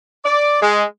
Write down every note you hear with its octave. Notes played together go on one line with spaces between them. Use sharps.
D5
G#3